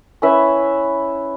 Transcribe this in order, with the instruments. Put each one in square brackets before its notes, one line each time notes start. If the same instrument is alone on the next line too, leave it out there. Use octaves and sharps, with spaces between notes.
[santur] C#4 E4 B4 E5